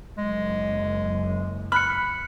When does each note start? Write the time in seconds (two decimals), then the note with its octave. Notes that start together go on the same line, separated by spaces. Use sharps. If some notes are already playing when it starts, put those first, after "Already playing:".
0.18 F#1 F#2 G#3
1.72 B5 F6 F#6 C#7